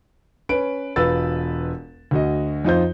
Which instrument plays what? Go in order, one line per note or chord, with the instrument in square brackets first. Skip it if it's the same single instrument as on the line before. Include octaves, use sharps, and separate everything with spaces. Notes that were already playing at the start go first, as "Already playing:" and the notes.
[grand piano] C#4 B4 D7
E1 F4 B4 E6 A6
D2 F#4 D#5
F2 D#4 F4 C5 G6